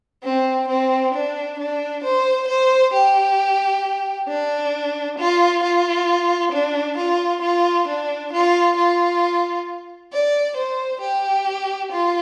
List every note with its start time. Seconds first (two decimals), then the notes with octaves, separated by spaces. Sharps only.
0.23 C4
0.68 C4
1.14 D4
1.59 D4
2.04 C5
2.48 C5
2.93 G4
4.28 D4
5.18 F4
5.63 F4
6.52 D4
6.97 F4
7.42 F4
7.87 D4
8.33 F4
8.76 F4
10.12 D5
10.57 C5
11.01 G4
11.92 F4